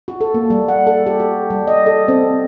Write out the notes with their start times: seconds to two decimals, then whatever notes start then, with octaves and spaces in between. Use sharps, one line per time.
0.08 F#4
0.21 A4
0.34 A#3
0.50 G3
0.68 F#5
0.87 A4
1.06 G4
1.20 F#4
1.50 G3
1.67 D#5
1.86 A4
2.08 C4